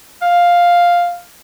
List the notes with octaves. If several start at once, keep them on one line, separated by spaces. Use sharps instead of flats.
F5